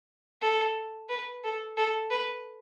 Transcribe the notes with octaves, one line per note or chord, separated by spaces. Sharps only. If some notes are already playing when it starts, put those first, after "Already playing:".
A4
B4
A4
A4
B4